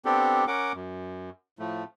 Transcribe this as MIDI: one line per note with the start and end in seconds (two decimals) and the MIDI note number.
0.05 0.45 59
0.05 0.45 60
0.05 0.45 62
0.05 0.45 67
0.05 0.45 69
0.47 0.72 61
0.47 0.72 70
0.47 0.72 78
0.47 0.72 86
0.74 1.30 42
1.59 1.84 45
1.59 1.84 53
1.59 1.84 57